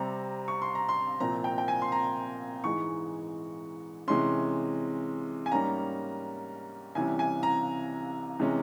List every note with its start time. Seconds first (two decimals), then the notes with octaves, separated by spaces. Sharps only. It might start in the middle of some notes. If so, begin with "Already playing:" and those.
Already playing: C3 G3 C4 A#5
0.48 C#6
0.62 C6
0.75 A#5
0.89 C6
1.20 C2 A#2 F3 C4 A#5
1.44 G5
1.58 G5
1.68 G#5
1.82 C6
1.92 A#5
2.64 G#2 E3 G#3 C#6
4.08 C3 E3 G#3 C#4 C6
5.46 G#5
5.51 G#2 G3 A#3 C#4 A#5
6.95 C2 C3 E3 G3 C#4 G#5
7.19 G#5
7.43 A#5
8.39 C3 E3 G#3 C#4